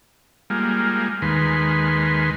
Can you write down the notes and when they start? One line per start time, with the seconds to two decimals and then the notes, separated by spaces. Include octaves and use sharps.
0.50 G3 G#3 A#3 F4
1.22 D#2 D#3 G#3 B4 C6